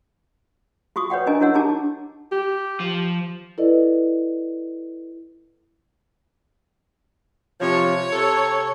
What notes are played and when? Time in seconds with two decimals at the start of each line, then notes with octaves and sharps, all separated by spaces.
0.96 F4 F#4 C#6 D#6
1.10 B4 C#5 D5 F#5 G5
1.27 C#4 D4 A#4 D#5 G#5 A#5
1.40 E4 F#4 A#4 C#5 F#5 E6
1.54 D4 D#4 G4 A5 A#5 D6
2.32 G4
2.80 F3
3.58 E4 A4 B4 D5 D#5
7.61 C3 F3 C#5
8.13 C3 A4